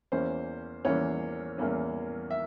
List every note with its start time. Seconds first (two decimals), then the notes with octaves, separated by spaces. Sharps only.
0.12 E2 E3 A#3 C#4 C5
0.85 E2 E3 A#3 C#4 C#5
1.58 E2 E3 A#3 C#4
2.31 E5